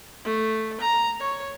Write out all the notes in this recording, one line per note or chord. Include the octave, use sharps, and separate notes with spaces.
A3
A#5
C#5